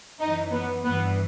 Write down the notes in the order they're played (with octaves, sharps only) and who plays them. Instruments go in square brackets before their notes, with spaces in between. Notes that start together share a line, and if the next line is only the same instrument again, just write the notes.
[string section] F#2 E3 D#4
B3
G2 E3 B3